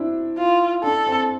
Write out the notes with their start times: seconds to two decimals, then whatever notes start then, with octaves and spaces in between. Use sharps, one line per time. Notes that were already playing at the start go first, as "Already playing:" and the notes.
Already playing: C4 D4 E4
0.38 F4
0.84 D4 A4
1.07 C4